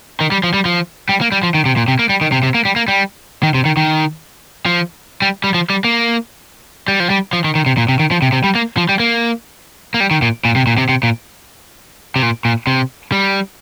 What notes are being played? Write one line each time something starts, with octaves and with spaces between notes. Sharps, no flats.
D#3
G3
F3
G3
F3
G3
A#3
G3
F3
D#3
C3
A#2
C3
A#3
G3
D#3
C3
C3
A#3
G3
A#3
G3
D#3
C3
D#3
D#3
F3
G3
G3
F3
G3
A#3
G3
F3
G3
F3
D#3
D#3
C3
A#2
C3
D#3
F3
C3
C3
G3
A#3
F3
G3
A#3
A#3
G3
D#3
A#2
A#2
C3
A#2
C3
C3
A#2
C3
A#2
A#2
C3
G3